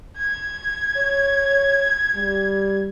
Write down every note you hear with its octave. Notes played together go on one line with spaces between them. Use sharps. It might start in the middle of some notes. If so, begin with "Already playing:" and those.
G#6
C#5
G3